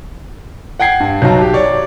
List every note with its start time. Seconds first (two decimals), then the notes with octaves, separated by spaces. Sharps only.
0.80 F#5 G5 G#6 C7
1.00 G2
1.22 B1 F#3 D#4 F#4 A5 A#5
1.41 G4
1.53 C#5 D5